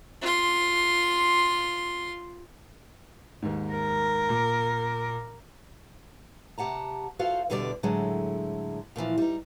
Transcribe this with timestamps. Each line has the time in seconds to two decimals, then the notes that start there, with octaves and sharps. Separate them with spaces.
0.22 F4 C6
3.42 D#2 G#2
3.72 A#4
4.29 A#2
6.58 C3 G4 F#5 A5 A#5
7.19 F4 F#4 A4 C5 F5
7.50 E2 B2 D3 G3 G4 D5
7.83 A2 D3 F#3 G#3 A3
8.96 A#2 D3 E3 F3
9.18 G3 D#4